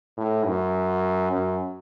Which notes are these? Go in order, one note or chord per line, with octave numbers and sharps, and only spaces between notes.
A2
F#2
F#2